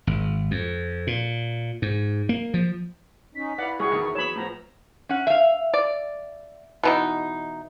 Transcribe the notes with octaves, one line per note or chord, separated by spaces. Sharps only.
G#1
F2
A#2
G#2
A#3
F3
C#4 D#4 B6
E4 B4 D5 F5 F#5
C2 F#4 G#4 C#6
E2 D#3
E3 F#3 B3 C#5 B5 E7
A2 F3 B3 A#5
C#4 F#5
E5 F5
D5
B2 E3 D#4